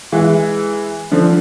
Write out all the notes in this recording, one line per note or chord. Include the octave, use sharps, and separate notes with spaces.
E3 G#3
D3 F3